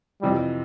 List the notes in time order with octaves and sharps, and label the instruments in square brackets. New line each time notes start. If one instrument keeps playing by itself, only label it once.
[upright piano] F2 C3 E3 [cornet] G3